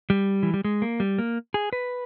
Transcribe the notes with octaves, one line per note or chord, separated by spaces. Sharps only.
G3
E3
G3
G#3
A#3
G3
A#3
G#4
B4